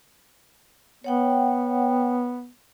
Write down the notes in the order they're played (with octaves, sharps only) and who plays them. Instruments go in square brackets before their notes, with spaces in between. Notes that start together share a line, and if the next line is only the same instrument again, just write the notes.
[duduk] B3 [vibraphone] C#5 F#5 G5